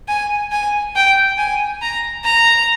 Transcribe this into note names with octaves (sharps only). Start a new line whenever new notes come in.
G#5
G#5
G5
G#5
A#5
A#5